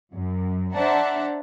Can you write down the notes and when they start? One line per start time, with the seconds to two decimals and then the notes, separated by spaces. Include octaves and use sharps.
0.13 F#2
0.75 D4 C5 E5 F#5 A5 A#5